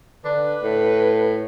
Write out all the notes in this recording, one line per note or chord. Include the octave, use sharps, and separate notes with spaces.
D3 D4 B4
A2 A4